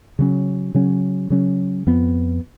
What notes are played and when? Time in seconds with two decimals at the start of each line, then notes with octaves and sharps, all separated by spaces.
0.19 C#3 F#3 C#4
0.75 C#3 F#3 C#4
1.30 C#3 F#3 C#4
1.87 F2 F3 B3